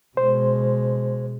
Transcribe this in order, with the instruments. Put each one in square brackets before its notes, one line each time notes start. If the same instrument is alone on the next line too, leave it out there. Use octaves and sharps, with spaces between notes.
[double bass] B2 G#3 [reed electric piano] C5